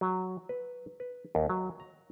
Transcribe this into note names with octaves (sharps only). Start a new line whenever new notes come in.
F#3
B4
B4
D#2
F#3
A#5